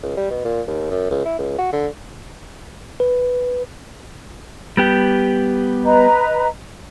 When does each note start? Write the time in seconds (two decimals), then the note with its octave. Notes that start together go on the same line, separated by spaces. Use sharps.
0.03 C#2
0.17 G3
0.30 B2
0.45 A#2
0.67 D#2
0.91 F#2
1.11 C#2
1.25 E4
1.39 C#2
1.58 F#4
1.73 D3
3.00 B4
4.77 G3 B3 G4
5.85 B4 D#5 A#5